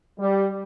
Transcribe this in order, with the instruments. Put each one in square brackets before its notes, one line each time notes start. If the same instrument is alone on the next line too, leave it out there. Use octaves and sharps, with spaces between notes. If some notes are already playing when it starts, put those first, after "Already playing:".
[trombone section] G3